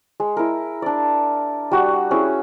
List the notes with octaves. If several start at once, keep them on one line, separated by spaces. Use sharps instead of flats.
G#3
E4 A#4
D4 D5
G3 F#4 F#5
C#4 E4 G#4